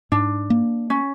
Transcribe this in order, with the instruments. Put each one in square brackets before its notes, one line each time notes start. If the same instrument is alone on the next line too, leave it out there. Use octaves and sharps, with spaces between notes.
[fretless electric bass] G#2 [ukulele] D4
[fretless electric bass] A#3
[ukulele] C#4